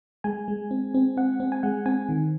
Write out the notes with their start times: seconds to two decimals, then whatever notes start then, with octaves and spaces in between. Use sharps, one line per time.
0.24 G#3 G#5
0.48 G#3
0.71 C4
0.94 C4
1.17 C4 F#5
1.40 C4
1.52 G#5
1.63 G#3 F#5
1.86 C4 G#5
2.09 D#3